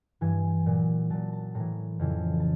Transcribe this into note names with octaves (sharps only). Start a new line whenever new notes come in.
G2 E3 G#5
A#2 F#3
A#2 F#3 A5
A5
A2 E3 A#5
F2 C#3 E3
A5